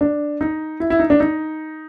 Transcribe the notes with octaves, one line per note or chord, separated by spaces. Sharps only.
D4
D#4
E4
E4
D#4
D4
D#4